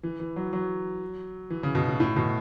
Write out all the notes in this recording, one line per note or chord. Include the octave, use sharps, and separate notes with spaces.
E3
E3
F#3
F#3
E3
C#3
B2
A2
A2
B2